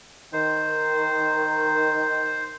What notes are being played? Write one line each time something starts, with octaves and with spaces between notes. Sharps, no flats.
D#3 C5